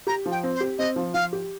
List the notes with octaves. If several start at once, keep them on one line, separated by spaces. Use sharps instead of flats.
G4 A#5
F3
G5
C4
C5
G4
C4 D#5
F3
F3 F5
G4